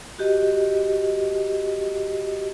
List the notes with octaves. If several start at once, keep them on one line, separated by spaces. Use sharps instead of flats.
F#4 G4 D#5